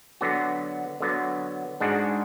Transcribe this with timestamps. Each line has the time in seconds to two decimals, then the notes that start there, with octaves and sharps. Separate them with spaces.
0.21 D3 F#3 B3 F#4
1.00 D3 F#3 B3 F#4
1.80 G#2 G#3 D4 F#4